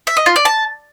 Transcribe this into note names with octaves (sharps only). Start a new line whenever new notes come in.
E5
D#5
F4
D5
A5